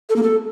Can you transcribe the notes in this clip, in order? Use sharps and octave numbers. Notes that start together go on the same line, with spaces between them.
A4
A#3
A4